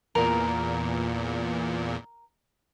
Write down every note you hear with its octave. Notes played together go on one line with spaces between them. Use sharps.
E2 A#2 A#4